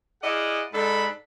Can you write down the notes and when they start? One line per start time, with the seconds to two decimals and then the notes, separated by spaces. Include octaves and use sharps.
0.23 E4 G#4 D5 D#5 F5 F#5
0.73 G#2 G#3 D4 A4 A5 B5